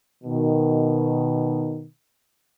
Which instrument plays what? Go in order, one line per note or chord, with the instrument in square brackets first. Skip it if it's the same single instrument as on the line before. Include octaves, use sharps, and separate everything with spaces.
[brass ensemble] B2 D#3